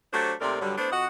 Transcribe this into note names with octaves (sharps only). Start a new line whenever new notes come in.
F#3 A3 D4 G4 C5
D#2 C3 A3 C4 A#4 D5
G2 D3 F#3 G3
A3 B3 D4 E4 C5
F2 F#4 D#5 F#5